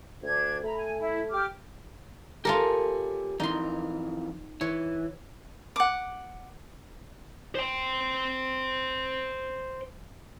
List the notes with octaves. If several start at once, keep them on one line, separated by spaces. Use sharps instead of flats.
D2 D4 G#6
A3 A#5 B5
G#5
E4
G4 D6 F6
F4 G4 A4 A#4 C#5 G#5
F2 E3 D#4 A#4 C6
E3 C#5
F#5 D6
C5 G5